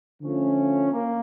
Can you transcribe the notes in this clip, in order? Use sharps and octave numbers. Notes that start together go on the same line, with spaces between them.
D3 F3 A3 C#4 F4
A#3